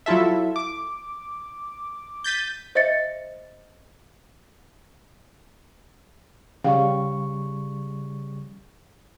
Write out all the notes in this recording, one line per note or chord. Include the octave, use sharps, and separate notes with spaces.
F#3 E4 F4 A4 E5
D6
G6 A6 B6 D#7
C5 D#5 E5 A6 C#7
C#3 G3 F5 G5 C#6